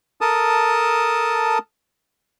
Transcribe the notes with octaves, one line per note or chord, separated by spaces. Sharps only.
A4 A#4 A5 D#6